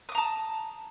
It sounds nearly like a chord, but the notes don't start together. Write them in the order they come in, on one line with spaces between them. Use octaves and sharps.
D#6 D6 A#5 A5